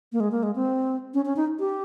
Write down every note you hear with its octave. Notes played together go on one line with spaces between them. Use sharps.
A#3
G#3
A#3
G#3
C4
C#4
C#4
D#4
G4